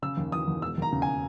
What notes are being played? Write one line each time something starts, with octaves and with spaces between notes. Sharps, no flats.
C#3 E6
D#2
E3 D#6
D#2
E1 E6
D#2 A#5
C#3
G#5